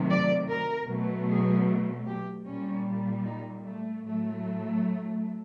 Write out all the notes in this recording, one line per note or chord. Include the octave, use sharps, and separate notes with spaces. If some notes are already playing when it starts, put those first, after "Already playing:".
Already playing: C3 D#3 F#3 A3
D5
A#4
B2 F#3 A3
G#4
G4
A#2 G3 C#4
D#4
A3
A2 F#3 A3